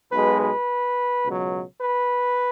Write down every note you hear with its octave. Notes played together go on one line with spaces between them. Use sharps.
B1 B2 G#3 B4
B4
C#2 B2 F#3
B4